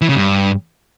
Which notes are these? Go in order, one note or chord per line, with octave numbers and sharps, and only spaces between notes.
E3
C#3
G2